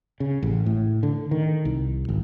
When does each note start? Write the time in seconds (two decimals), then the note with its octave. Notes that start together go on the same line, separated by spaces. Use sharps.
0.20 C#3
0.42 A1
0.66 A2
1.03 D3
1.31 D#3
1.65 C2
2.09 G#1